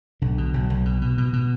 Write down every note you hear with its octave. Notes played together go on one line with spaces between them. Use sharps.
B1 D3
B2
B1
B1
B2
B2
B2
B2